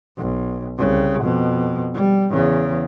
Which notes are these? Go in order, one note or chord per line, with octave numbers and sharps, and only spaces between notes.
B1
C2 C#3
F2 B2
G3
E2 C#3